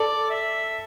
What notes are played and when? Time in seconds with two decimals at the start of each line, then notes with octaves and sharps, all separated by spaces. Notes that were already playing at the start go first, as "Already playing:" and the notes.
Already playing: A4 D5
0.30 E5